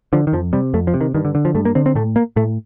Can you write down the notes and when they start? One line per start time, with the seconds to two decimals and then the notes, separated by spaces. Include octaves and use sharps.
0.13 D3 F3
0.27 D#3
0.33 F2 F3
0.53 C3 G3
0.74 F2 A3
0.87 F3
0.94 C3
1.01 D#3
1.14 G2 D#3
1.25 D3
1.35 D3
1.45 F3
1.55 G2 A3
1.65 A#3
1.75 D3 C4
1.86 C4
1.95 A2 A3
2.16 A#3
2.36 A2 A3